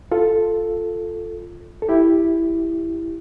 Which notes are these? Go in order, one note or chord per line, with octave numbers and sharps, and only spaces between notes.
F4 A4
A4
E4 G4